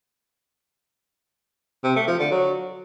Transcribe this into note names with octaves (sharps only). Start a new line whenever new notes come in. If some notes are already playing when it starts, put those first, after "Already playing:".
C3
A3
F3
D3
F#3